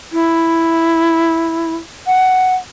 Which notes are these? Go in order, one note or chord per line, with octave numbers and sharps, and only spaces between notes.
E4
F#5